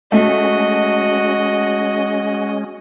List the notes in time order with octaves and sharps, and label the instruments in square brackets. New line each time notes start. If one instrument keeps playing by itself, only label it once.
[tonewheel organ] G#3 C#4 [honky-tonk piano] A3 [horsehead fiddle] F#4 [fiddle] D#5